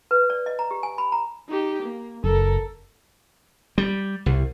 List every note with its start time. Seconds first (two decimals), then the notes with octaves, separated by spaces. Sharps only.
0.11 B4
0.30 D5
0.46 D#5
0.59 A#5
0.71 G4
0.83 G#5
0.98 B5
1.12 A#5
1.49 D#4 G4
1.83 A#3
2.24 F#1 A4 A#4
3.78 G3
4.26 C2